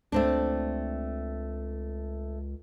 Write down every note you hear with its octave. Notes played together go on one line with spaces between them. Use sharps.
C#2 A3 C4 D4